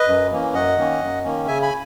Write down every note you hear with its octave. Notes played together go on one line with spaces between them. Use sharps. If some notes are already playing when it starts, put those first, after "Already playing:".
Already playing: B4 D#5
F#2
E3 A#3 C#4
F#2 D#5 F#5
D#3 A#3 C#4
F#2
D#3 A#3 C#4
C#3 E5 G#5
G#5 B5